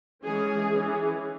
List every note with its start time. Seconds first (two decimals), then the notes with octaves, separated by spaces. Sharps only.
0.23 E3 G#3 C#4 G#4
0.72 E3 C#4